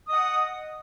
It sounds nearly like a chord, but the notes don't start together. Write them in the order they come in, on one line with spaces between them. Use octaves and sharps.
D#6 D#5 F#5